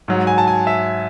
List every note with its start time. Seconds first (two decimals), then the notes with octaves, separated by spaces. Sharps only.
0.08 G#2 F#3
0.27 G#5
0.38 A5
0.47 G#5
0.67 E5